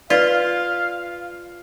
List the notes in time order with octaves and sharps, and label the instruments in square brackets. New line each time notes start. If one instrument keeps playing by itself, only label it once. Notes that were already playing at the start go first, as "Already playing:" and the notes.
[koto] F4 [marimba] B4 [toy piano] D5 [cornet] F5